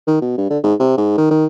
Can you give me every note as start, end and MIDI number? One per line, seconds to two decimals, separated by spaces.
0.07 0.18 51
0.22 0.37 47
0.38 0.48 43
0.50 0.58 50
0.64 0.74 44
0.79 0.96 48
0.97 1.16 44
1.18 1.27 51
1.31 1.46 51